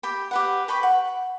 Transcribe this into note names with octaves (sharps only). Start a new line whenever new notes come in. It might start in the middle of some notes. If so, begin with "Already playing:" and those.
G4 G5 B5
G4 B4 F#5
B4 G5 B5 C#6
F#5